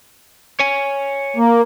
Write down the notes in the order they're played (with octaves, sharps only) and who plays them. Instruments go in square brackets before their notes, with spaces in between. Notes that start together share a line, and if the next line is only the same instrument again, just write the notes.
[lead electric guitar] C#5 G#5
[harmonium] A#3